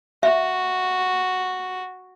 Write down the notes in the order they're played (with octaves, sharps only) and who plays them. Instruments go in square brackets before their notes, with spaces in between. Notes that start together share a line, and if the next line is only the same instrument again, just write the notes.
[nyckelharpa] F#4 [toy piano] E5